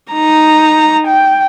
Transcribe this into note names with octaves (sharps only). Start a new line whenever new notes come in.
D#4 A#5
G5